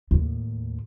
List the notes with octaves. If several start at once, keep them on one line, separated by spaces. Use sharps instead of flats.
D#2 A2